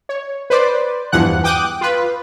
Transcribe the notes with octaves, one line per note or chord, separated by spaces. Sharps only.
C#5
B4 C5 D5
E2 G2 E3 F3 F#5 F#6
G5 D6 D#6 F#6
F4 B4